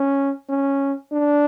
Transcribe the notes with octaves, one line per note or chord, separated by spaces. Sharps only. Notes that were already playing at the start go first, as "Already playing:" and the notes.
Already playing: C#4
C#4
D4